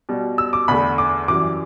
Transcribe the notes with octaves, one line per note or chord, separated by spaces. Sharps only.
B2 G3
E6
D6
E2 D3 A3 B5
D6
F#2 E3 G3 D6